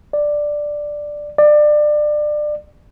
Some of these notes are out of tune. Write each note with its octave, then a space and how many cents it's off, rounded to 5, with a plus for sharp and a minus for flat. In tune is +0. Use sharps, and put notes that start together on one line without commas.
D5 +5
D5 +25